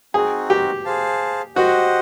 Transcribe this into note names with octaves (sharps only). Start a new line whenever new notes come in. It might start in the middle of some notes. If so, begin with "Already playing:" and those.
C4 D#4 F#4 G#4
G4
G#4 C5 F5 A5
F#4 G4 C5 D#5 F#5